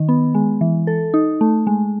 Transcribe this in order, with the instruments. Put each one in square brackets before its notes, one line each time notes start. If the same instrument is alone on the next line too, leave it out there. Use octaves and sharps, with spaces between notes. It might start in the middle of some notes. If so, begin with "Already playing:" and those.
Already playing: [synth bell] D#3
B3
G#3
E3
A4
D#4
A3
G#3